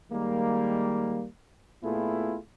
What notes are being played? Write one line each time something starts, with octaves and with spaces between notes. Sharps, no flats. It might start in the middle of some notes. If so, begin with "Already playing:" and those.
D#3 G3 G#3 A#3
A#2 A3 B3 E4 F4 G#4